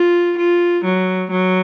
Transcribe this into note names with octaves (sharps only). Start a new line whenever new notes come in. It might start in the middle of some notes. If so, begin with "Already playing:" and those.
Already playing: F4
F4
F#3
F#3